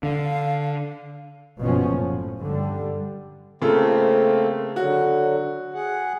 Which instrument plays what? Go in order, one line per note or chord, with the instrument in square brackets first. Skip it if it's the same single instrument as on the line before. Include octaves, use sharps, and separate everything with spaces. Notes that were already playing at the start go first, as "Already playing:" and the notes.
[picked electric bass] D3 [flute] F5
[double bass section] F#1 B2 F3 C#4
A2
G2 D3 G3
[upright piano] C#3 F4 A4 [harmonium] A3 A#3 C4
[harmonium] D3 F#3 [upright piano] F#4
[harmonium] G#4 F#5